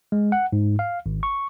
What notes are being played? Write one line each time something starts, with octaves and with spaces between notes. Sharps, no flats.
G#3
F#5
G#2
F5
G#1
C#6